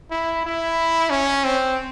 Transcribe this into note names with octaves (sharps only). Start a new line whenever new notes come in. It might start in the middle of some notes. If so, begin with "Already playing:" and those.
E4
E4
C#4
C4